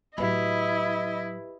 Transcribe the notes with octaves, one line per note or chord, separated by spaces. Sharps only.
A2 F#3 E4 G4 B4 D#5 B5